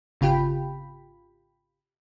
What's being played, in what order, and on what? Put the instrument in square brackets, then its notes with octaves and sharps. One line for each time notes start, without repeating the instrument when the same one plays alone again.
[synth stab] G#1 C#3 F4 G4 G5 B5